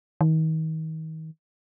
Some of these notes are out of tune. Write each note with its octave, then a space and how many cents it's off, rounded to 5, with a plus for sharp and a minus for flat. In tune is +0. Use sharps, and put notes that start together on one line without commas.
D#3 +35